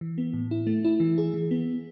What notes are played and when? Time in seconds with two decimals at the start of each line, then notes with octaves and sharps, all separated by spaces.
0.01 E3
0.18 B3
0.34 A2
0.51 E4
0.67 A3
0.85 E4
1.00 E3
1.18 G#4
1.34 E3
1.51 B3